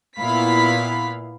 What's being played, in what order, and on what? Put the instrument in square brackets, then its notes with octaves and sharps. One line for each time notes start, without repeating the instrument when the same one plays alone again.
[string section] A#2 B3 E4 F5 B5 B6